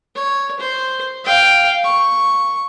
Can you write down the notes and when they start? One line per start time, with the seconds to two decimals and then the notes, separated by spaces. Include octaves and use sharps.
0.15 C#5
0.60 C5
1.25 F5 G5
1.84 C#6